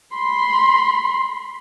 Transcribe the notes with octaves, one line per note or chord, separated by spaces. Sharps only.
B5 C6